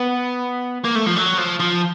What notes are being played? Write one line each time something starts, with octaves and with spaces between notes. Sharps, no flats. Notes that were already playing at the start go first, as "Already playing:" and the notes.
Already playing: B3
A#3
A3
F3
F#3
F3
F3